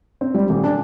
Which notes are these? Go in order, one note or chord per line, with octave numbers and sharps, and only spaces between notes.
C4
G3
D#1
D4